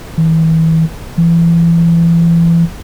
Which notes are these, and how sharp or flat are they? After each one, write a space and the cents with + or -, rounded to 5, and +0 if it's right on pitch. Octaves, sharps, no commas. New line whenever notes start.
E3 -35
E3 +30